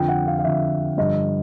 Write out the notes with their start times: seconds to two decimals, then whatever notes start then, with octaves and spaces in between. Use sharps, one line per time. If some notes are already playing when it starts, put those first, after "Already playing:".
Already playing: F2 D3 F3 G5
0.08 F#5
0.26 F5
0.38 F5
0.44 F2 D3 F3 E5
0.97 G2 D3 F3 D#5